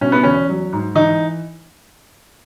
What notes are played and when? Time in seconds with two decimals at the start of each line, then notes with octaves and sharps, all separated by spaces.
0.01 B2 C#4
0.12 B3
0.23 E2 C#4
0.49 F#3
0.73 G#2
0.95 E3 D#4